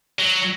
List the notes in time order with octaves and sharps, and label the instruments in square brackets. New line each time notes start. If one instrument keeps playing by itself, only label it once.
[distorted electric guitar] F#3